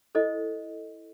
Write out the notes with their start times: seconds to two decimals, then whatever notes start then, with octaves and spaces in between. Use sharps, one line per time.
0.15 E4 A4 C5 D#5